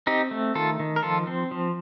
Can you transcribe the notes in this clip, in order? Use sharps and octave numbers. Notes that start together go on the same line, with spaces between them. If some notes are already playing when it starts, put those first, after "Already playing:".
C4 D#4 G4
A3
D#3 F4 A4
D#3
A#4
F3 F4 A4
C4
F3